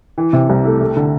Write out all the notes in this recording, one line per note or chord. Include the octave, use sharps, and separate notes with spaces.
E3
C3
C2
A3
A3
D3